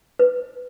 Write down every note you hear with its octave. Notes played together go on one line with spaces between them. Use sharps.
B4